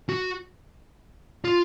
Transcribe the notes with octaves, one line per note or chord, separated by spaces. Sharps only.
F#4
F4